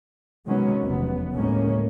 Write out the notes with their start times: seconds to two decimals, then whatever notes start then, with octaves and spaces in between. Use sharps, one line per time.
0.47 C3 D#3 F#3 G#3 B3 C#4
0.84 F1 E2 B3
1.33 D2 A2 C#3 G#3 A#3 C#4